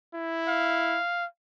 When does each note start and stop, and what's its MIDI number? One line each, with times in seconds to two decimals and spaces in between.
0.15 0.99 64
0.48 1.25 77